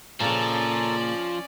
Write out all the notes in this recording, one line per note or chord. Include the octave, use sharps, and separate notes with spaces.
A#2 C#3 F3 C#4 A4 D5 A#5